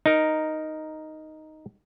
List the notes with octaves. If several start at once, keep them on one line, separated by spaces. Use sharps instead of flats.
D#4 A#4